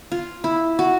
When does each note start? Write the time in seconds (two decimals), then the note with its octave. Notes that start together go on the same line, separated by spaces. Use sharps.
0.12 F4
0.44 E4
0.79 F#4